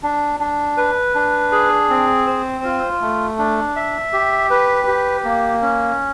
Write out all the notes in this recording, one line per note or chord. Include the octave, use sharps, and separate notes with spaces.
D4
D4
B4
D4
G#4
C4
C5
F4
A3
D4
E5
G4
B4
G4
A#3
C#4